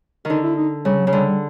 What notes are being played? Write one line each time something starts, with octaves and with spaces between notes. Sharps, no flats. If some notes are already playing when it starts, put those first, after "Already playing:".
D3 D#3 D#4
E4
D#4
C#3 G3
F#3
C#3
D3 G3
G3